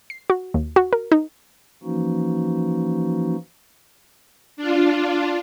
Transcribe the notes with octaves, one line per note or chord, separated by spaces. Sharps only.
C7
F#4
D#2
F#4
A#4
D#4
E3 F3 A#3 C#4 D#4 F#4
D4 F4